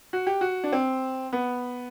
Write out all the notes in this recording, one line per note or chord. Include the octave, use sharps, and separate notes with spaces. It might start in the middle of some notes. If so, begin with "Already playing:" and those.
F#4
G4
F#4
D4
C4
B3